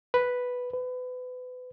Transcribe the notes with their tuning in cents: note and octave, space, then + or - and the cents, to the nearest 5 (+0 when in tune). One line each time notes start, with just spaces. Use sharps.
B4 +0
B4 +30